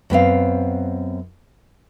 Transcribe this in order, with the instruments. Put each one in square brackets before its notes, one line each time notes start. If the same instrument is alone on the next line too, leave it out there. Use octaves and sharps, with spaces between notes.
[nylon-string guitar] F#2 B3 C4 F5